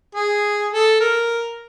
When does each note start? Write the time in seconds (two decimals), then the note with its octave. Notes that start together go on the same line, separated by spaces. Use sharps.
0.15 G#4
0.72 A4
1.00 A#4